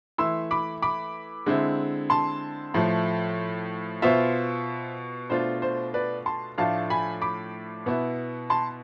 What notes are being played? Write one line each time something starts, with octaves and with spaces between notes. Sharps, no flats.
E3 A3 E4 C6 E6
B5 D6
B5 D6
D3 G#3 C4 E4
A5 C6
A2 F3 A3
B2 B3 F4 C5 E5
B2 A3 D4 F4 C5
C5
B4 D5
A5 C6
A2 F3 A3 D4 F4 F5 A5
G#5 B5
B5 D6
B2 B3 E4
A5 C6